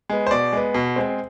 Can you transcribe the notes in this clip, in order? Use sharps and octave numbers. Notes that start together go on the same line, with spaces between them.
G#3 B3
C5
B2 D5
G#3 B3
B2
G#3 C4